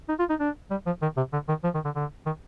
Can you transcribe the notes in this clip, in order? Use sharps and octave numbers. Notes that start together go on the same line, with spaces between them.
D#4
F4
D#4
D4
G3
F3
D#3
C3
D3
D#3
F3
D#3
D3
D3
D#3